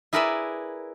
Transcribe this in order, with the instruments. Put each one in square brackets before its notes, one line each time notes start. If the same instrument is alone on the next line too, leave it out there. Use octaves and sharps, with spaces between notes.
[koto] E4 G#4 A#4 B4 D5 E5